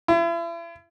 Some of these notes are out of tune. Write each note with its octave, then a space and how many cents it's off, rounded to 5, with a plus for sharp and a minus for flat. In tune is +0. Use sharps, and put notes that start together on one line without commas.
E4 +40